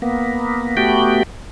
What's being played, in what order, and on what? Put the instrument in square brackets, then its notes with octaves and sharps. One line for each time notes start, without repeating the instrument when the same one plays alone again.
[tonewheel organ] A#3 B3
A3 B3 F#4 G4 G5